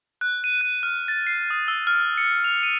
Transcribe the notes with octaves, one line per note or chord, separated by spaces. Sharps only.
F#6
D#7
F#6
F6
A6
C7
D#6
E6
F6
C#7
F7
D#7